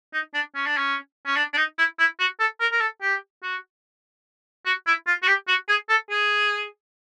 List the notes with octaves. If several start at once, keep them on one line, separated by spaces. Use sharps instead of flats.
D#4
D4
C#4
D4
C#4
C#4
D4
D4
D#4
E4
E4
F#4
A4
A#4
A#4
A4
G4
F#4
F#4
E4
F4
F#4
G4
F#4
G#4
A4
G#4